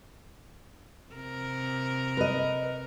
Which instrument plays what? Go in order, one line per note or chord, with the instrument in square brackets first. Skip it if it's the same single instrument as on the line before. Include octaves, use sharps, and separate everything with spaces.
[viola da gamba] C3 A#4
[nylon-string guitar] B4 D#5